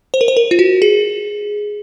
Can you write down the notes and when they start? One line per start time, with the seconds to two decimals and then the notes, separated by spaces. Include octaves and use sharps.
0.14 C5
0.21 A#4
0.28 C5
0.37 A#4
0.51 F4
0.59 F#4
0.82 G#4